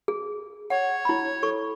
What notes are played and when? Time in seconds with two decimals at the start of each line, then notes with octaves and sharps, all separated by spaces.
0.08 G#4
0.70 C#5 F#5
1.05 E4 B5
1.43 A4 C#6